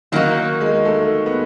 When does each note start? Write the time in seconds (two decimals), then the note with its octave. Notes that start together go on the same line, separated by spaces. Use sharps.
0.12 D#3 F#3 A#3 D#4 F#4
0.61 G#3
0.85 A3
1.26 B3